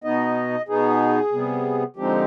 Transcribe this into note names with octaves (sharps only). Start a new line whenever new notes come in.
B2 B3 D#4 D#5
B2 B3 D#4 G#4
C3 G3 B3
D3 F3 G#3 C4 D#4 G4